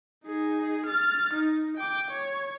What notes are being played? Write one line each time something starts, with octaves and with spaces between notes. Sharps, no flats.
D#4 G#4
F6 A6
D#4
G5 D6
C#5